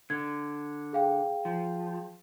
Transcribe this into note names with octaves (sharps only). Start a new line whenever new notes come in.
D3 G#6
G#4 F5 G5
F3